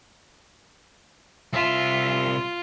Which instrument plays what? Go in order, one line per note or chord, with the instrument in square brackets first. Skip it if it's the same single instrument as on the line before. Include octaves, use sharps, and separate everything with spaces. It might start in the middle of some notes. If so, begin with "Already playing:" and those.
[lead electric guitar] C2 E5 [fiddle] F4